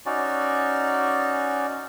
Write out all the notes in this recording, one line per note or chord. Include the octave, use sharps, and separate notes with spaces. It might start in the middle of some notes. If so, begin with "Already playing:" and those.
C#4 D#4 F#4 D5